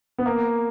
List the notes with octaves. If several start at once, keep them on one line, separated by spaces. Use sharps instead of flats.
B3
A#3